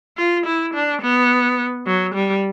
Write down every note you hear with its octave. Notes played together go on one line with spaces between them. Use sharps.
F4
E4
D4
B3
F#3
G3